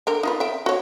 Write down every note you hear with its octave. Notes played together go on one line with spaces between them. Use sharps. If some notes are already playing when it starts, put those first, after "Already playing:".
D3 A#4 G5
D#4 F4 B4
E5 G5
F#4 C#5